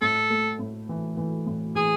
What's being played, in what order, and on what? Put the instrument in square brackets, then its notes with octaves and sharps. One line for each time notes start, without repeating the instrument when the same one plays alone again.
[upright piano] A2 [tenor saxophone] A4
[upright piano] A3
A2
E3
E3
A2
[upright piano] E3 [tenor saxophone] G#4